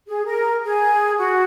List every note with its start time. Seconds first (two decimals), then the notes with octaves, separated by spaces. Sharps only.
0.08 G#4
0.26 A#4
0.64 G#4
1.18 F#4